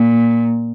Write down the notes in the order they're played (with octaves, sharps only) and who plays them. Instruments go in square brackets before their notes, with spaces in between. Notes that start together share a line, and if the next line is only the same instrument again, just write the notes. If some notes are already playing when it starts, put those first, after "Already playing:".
Already playing: [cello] A#2